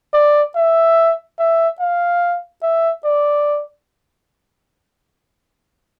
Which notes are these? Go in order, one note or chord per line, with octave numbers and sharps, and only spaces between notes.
D5
E5
E5
F5
E5
D5